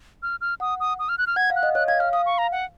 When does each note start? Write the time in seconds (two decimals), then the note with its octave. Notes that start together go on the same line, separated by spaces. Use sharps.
0.23 F6
0.41 F6
0.60 F#5 D#6
0.80 D#6
0.99 D#6
1.09 F6
1.18 F#6
1.27 F6
1.36 F#5 G#6
1.50 F5
1.56 F#6
1.63 D#5
1.75 C#5 F#6
1.88 F5 G#6
2.00 F5 F6
2.13 F5 D#6
2.26 C#6
2.38 A#5
2.52 F#5